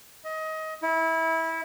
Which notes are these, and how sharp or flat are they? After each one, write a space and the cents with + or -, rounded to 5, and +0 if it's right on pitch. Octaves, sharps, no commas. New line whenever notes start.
D#5 +25
E4 -20